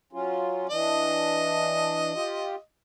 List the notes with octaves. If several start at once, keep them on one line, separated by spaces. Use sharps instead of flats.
F#3 C#4 F4
E3 D4 D#5
F4 G4